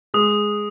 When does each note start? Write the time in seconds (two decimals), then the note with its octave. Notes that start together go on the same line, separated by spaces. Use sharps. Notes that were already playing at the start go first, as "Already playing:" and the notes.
0.14 G#3 D#6